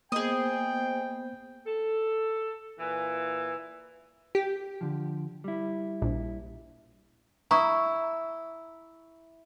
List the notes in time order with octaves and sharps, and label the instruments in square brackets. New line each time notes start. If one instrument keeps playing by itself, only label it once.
[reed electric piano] A#3 [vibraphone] B3 C5 [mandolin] G#4 D#5 [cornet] G5
[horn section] A4
A#2 E3
[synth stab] G4
[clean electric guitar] D3 F3
G3 E4
[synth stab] A#1
[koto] E4 [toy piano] A#5 C#6 D#6